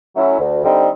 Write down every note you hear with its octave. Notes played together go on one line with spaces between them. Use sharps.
F#3 A3 C#4 E4
D2
D3 G3 C4 D#4